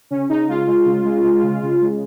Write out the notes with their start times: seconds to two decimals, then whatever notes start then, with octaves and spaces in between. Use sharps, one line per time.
0.11 C#3 C#4
0.29 C#3 D#4
0.48 G#3 F4
0.67 G#3
0.86 C#3
1.05 G#3
1.24 G#3
1.43 C#3
1.62 C#3
1.81 G#3